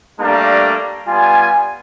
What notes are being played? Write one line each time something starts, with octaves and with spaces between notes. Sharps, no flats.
G3 A3 A#3 D4 F5 A#5
G3 B3 F4 G#5